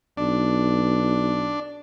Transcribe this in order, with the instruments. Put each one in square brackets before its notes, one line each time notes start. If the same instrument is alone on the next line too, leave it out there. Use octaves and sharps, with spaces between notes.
[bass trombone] B1 [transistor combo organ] D4